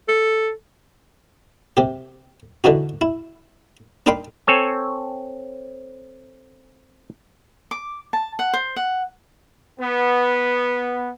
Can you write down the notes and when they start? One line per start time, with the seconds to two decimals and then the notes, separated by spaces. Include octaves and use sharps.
0.09 A4
1.77 C3 G4
2.64 D3 E3 D4 D#4 F#4
3.01 E4
4.06 D4 D#4 A#4 G5 B5 C6
4.47 C4 A4 C#5 G#5
7.71 D6
8.13 A5
8.39 F#5
8.53 C5
8.76 F#5
9.80 B3